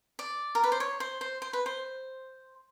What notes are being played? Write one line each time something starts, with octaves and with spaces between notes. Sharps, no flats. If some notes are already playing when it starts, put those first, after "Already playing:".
D5
A#4
B4
C5
C#5
C5
C5
C5
B4
C5